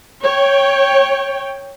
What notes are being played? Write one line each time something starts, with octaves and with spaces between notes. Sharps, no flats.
C#5 G5